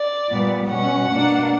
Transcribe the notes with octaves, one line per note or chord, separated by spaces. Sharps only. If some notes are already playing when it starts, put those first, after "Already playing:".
Already playing: D5
A#2 G3 B3
B2 G3 C#4 F#5
B2 A#3 D4